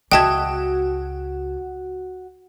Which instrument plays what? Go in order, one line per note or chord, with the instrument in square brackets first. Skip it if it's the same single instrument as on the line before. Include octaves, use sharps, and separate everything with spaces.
[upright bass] C#2 [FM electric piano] F#4 F#5 [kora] D#5 E5 [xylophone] G5 A5 G#6